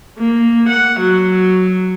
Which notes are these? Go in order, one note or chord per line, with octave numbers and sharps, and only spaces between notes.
A#3
F#5
F#3